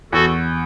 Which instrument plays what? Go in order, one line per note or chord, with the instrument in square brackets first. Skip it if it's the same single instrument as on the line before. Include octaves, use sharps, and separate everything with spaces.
[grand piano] E2 [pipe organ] F#4 A4